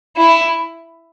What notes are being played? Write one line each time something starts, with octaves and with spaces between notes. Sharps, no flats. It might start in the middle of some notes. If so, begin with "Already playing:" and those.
E4